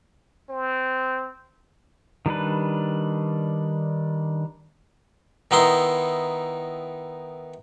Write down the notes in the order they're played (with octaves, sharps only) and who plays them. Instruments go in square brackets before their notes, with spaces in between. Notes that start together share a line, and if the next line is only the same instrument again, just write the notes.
[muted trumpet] C4
[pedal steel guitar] D#3 G3 D4 B4
[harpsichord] D#3 B3 D#4 E4 C6